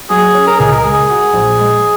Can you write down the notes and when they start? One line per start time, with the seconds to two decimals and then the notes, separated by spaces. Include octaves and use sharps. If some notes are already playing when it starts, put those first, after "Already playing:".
0.10 F#3 G#4
0.35 C#4
0.47 A#4
0.60 C#2 G#4
0.71 A#4
0.84 G#3 G#4
1.10 F#4
1.34 A#1
1.59 G#3